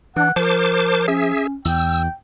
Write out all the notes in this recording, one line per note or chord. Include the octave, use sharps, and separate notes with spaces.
E3 D4 F#5
F3 A#4 C5 A5 D6
C#4 G#4 E5
E2 G5 E6